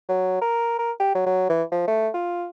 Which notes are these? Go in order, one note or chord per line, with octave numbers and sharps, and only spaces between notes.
F#3
A#4
A#4
G4
F#3
F#3
E3
F3
A3
F4